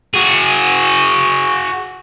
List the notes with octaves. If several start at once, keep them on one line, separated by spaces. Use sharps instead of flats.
F#4 G#4